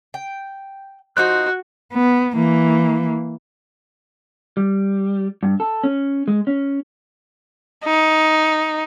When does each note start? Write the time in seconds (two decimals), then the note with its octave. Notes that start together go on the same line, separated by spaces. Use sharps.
0.14 G5
1.17 F3 D#4 F#4 C5 F#6
1.93 B3
2.35 E3 A#3
4.57 G3
5.43 G2
5.60 A4
5.84 C#4
6.28 G#3
6.47 C#4
7.84 D#4